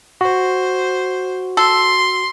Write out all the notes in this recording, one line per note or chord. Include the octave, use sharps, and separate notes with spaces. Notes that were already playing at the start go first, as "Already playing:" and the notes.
F#4 C5
A4 C6